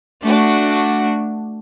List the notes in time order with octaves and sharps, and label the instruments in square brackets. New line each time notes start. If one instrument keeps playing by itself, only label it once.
[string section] A3 D4 F#4